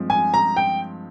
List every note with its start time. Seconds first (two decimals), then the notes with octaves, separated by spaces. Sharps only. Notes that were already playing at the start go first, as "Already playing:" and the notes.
Already playing: G2 F3 G#3 C4
0.10 G#5
0.34 A#5
0.56 G5